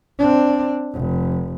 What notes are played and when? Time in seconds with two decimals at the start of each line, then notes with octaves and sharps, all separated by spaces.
0.19 C4 D4
0.94 F1